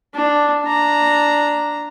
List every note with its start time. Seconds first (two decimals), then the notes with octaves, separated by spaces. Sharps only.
0.15 D4
0.63 D4 A#5